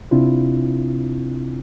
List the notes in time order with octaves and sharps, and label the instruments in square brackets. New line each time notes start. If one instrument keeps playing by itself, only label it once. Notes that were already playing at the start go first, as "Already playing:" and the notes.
[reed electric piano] C3 C4 D4 E4 F4